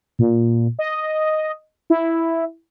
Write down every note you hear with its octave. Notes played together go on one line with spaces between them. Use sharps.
A#2
D#5
E4